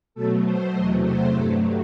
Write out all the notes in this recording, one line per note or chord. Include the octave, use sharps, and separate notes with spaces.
B2 F#3 A3 A4
C5
E2 C3 F#3 A3 D#5
C5
G2 F#3 A3 A4